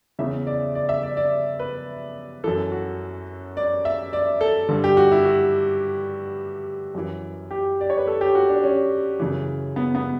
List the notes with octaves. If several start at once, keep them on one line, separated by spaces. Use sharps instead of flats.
E2 C#3 E3 E5
D5
D5
E5
D5
D5
B4
F#2 E3 A4
F#4
D5
E5
D5
A4
G2 D3
G4
F#4
E4
F#4
F#2 E3
G4
D5
C#5
B4
A4
G4
F#4
D4
C#4
F#2 C#3 E3
B3
B3